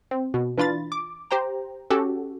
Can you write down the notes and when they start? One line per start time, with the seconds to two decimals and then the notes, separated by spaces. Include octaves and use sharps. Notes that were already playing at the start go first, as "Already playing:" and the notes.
0.11 C4
0.34 B2
0.58 E3 D4 F4 B5 A6
0.92 D6
1.31 G4 C5 G5 A#5
1.90 C#4 F#4 G4 A4